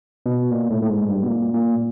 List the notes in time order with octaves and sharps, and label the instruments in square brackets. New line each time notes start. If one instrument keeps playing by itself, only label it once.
[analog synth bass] B2
A#2
A2
A2
G#2
G2
B2
A#2
A#2